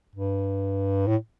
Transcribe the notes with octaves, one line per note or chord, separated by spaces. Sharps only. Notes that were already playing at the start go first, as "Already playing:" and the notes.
G2
A2